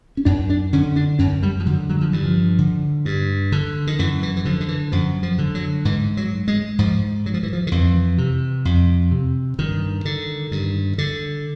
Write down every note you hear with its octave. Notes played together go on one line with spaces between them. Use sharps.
C#4
F#2 D4
D4
D3 C#4
D4
F#2 C#4
G3
F3
D3 F#3
F#3
F3
G2 E3
F3
D3
G2
D3
D#3
F#2 E3
E3
E3
D3 F3
D#3
E3
F#2 F3
F3
D3
F#3
G#2 E3
F#3
G#3
G#2 F3
F#3
F3
E3
F3
D#3
F2 E3
C3
F2
C3
G2 D#3
D3
G2
D3